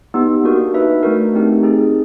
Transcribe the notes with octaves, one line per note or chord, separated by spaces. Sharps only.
B3 D#4 G4
A#3 D4 F#4 A#4
D#4 F#4 B4 E5
A3 D4 F#4 A#4
A3 C4 D#4 G4 A#4
C4 D#4 G#4